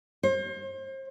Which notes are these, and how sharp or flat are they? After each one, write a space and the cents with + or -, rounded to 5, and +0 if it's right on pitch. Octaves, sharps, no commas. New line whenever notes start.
C5 +35